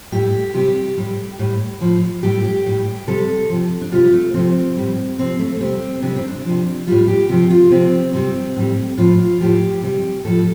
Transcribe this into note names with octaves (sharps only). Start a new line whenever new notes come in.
A2 G3 G4
C3 G3 G4
A2 G3
A2 G3
A2 F3
A2 G3 G4
G4
A2 G3
C3 G3 A4
C3 F3
D4
C3 G3 F4
A3
C3 F3 C4
A2 G3
C3 F3 C4
A3
C3 G3 C4
C3 G3 D4
C4
D4
C3 F3
A2 G3 F4
G4
C3 F3 G4
F4
C3 F3 C4
C3 G3 C4
A2 G3
A2 F3 F4
F4
A2 F3 G4
C3 G3
A2 F3 A4